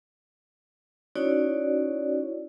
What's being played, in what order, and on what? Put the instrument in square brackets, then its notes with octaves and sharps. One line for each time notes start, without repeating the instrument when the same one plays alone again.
[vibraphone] C#4 D#4 E4 F#4 C#5 D5